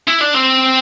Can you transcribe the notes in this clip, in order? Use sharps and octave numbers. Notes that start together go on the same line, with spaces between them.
E4
D4
C4